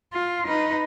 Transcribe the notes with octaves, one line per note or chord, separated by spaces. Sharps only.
F4
D#4 B4